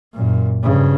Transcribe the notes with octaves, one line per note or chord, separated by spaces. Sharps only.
F#2 A#2
G2 C#3